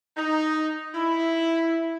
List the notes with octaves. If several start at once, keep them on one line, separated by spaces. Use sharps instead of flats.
D#4
E4